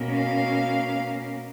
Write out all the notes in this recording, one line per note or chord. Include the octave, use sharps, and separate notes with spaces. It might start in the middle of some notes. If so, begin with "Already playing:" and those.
Already playing: B2 A#3 C#4
F5